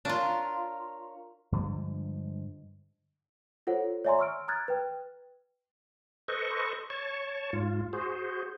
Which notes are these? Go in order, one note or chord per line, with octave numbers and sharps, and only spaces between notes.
D4 F4 A#4 C#5 F5
G2 D3 F3 G#3
F4 A4 C5 C#5 F#5
C#5 D5 E5 G#5 A#5 C6
C#6 E6 F6 D7
A#5 D#6 F6 F#6 G#6 A6
B4 G5
A4 B4 C5 D#5 C#6
C#5 A5 C#6
G#2 F4
F#4 G#4 C5